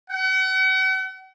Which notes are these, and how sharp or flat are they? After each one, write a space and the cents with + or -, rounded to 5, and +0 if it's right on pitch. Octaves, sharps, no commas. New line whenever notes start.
F#5 +40